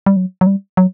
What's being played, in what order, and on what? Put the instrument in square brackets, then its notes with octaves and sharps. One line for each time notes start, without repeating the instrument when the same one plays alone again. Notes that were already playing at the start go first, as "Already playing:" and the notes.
[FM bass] G3
F#3
F#3
G3
F#3